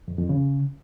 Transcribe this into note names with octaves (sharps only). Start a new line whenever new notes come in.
F2
F2
C#3